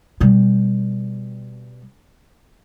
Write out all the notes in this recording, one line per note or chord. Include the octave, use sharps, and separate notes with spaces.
B2 G3